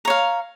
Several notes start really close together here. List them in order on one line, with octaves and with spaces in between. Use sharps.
A#5 C#5 F5